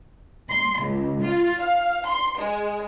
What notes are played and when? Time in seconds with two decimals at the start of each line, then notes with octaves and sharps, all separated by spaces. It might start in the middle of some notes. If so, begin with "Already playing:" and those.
0.50 C6
0.80 C#2
1.22 F4
1.60 F5
2.07 C6
2.40 G#3